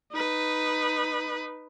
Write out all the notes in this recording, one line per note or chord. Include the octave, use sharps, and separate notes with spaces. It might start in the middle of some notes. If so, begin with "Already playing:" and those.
D#4 B4